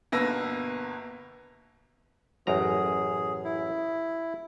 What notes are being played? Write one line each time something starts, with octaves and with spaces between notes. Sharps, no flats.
G1 B2 A#3 B4 E6 A#6
A1 F#2 G#4 A#5
E4